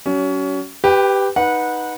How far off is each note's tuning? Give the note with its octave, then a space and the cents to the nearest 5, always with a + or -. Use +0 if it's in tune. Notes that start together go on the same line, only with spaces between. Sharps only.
F#3 +35 C#4 +25
G4 +0 B4 +5 G5 +35
D#4 +0 B4 -15 F#5 -20